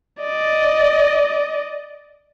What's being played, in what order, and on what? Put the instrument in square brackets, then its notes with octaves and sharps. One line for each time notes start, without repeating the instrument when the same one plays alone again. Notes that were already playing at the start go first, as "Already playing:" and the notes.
[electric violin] D5 D#5